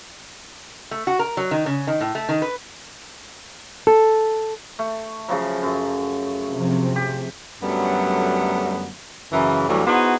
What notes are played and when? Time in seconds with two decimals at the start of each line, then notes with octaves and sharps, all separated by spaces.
0.91 A3
1.07 F#4
1.19 A#4
1.37 F#3
1.51 D#3
1.66 C#3
1.87 D#3
2.01 A2
2.15 A3
2.29 D#3
2.42 B4
3.87 A4
4.79 A3
5.28 C#3 F3 F#3
5.63 F#2
6.52 C3 F3 C4
6.96 G4
7.63 F#2 D3 F#3 G3 A3 B3
9.33 F#2 C#3 E3
9.69 D2 A2 E3 F#3 G3 A3
9.87 B3 D#4 E4 F#4 G#4 C5